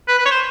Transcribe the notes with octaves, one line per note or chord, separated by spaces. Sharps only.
B4
B4
C#5
C5